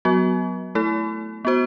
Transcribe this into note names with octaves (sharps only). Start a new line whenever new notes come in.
F#3 B3 F#4
A3 E4 A4
B3 F#4 C5